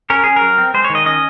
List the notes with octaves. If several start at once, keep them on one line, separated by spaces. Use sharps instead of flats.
C#4 A#4
C#4 G#4
A#4
F#3
C4
G#3 C5
C#5
D#3
D#5
C#4 D#5